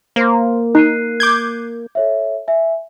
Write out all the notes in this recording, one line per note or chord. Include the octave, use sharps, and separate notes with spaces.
A#3 C5 C6
D#4 F#6 C7 D#7
D6 G6 G#6
A4 C#5 E5
E5 G#5